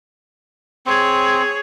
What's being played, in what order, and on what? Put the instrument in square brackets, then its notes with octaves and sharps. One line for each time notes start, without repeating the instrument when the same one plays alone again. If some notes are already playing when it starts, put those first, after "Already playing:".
[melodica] C4 [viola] G#4 C#5